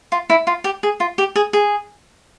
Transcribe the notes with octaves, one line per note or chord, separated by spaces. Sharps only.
F4
E4
F4
G4
G#4
F4
G4
G#4
G#4